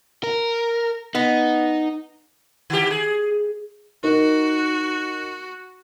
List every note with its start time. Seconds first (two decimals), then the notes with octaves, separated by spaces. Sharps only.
0.24 A#4
1.15 B3 D#4
2.70 D#3 G4
2.90 G#4
4.04 D#4 F#4 A#4